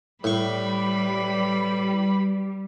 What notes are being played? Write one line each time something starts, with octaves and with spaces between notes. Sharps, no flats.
A2 G3 B4 B5 C#6